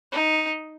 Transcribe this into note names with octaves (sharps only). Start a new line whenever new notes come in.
D#4